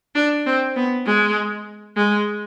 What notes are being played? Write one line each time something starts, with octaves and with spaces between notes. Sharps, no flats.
D4
C4
B3
G#3
G#3